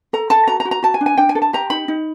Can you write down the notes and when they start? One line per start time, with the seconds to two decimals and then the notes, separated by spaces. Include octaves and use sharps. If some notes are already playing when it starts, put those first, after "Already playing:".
0.13 A4 A#5
0.30 A4 A5
0.48 F#4 A#5
0.60 A#5
0.65 F#4
0.71 A#5
0.83 F#4 A5
0.94 G#5
1.01 D4
1.06 G#5
1.18 D4 G5
1.29 G#5
1.35 A4
1.42 A5
1.53 G4 A#5
1.70 D#4 B5
1.88 D#4